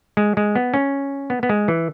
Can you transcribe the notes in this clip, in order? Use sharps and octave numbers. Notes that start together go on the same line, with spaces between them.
G#3
G#3
B3
C#4
B3
B3
G#3
E3